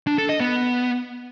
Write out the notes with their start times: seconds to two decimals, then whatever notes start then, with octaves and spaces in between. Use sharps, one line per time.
0.07 D4
0.18 A4
0.29 D#5
0.40 B3